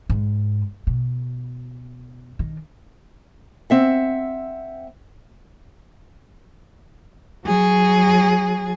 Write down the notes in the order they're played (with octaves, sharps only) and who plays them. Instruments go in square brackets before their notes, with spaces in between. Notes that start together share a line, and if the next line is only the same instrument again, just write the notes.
[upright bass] G#2
B2
D#3
[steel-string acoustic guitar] C4 E5 F#5
[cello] F#3 G#4